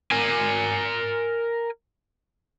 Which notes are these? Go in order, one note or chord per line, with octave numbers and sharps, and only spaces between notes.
A#4 G#5